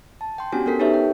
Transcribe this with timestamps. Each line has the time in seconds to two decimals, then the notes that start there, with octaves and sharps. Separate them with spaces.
0.21 A5
0.38 G5 C6
0.52 B3 C#4 D4 F#4 G4 G#5
0.66 B3 D4 A4 A#4 B6 C7
0.79 D#4 G4 A4 B4 C#5 E5
0.94 G5